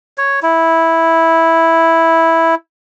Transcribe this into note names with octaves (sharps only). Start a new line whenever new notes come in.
C#5
E4